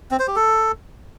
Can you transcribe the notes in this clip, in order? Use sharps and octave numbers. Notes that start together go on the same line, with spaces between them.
C4
C5
G4
A4